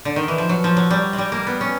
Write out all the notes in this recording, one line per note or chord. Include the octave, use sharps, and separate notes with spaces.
D3
D#3
E3
F3
F#3
F3
F#3
G3
G#3
G3
A#3
B3
C#4